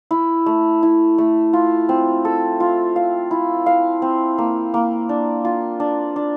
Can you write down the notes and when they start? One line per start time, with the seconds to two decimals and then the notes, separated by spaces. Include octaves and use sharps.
0.11 E4
0.46 A3
0.83 E4
1.18 A3
1.53 F4
1.89 C4
2.25 A4
2.60 F4
2.96 F5
3.31 E4
3.66 F5
4.02 C4
4.38 A#3
4.74 A#3
5.09 D4
5.45 F4
5.80 D4
6.16 D4